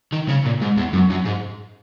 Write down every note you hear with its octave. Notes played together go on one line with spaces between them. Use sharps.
D#3
C#3
A#2
G#2
E2
F#2
F#2
G#2